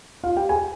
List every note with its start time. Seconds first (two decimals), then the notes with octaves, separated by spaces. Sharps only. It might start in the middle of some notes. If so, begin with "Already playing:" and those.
0.23 F4 F5
0.37 G4 G5
0.49 G#4 G#5